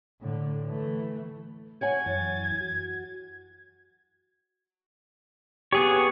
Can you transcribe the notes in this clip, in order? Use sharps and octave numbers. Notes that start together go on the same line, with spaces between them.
A2 D3
E3 A3
C#5 F#5 G#5 G#6
F#2 E3 A6
F#4
B3 G4 G#4 C#5 C#7